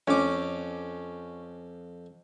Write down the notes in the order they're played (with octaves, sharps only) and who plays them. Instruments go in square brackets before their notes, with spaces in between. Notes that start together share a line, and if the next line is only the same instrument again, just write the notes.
[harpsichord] F2 D6 [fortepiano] C#4